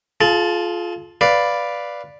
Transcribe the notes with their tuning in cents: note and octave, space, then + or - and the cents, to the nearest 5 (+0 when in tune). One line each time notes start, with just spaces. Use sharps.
F4 +0 G#4 +45 A5 +0
B4 +0 D5 +0 F5 +0